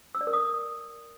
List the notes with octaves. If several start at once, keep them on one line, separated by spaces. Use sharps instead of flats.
E6
D5
A#4
D#6